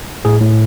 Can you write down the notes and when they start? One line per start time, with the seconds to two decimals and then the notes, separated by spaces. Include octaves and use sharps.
0.25 A2 G#4
0.41 A2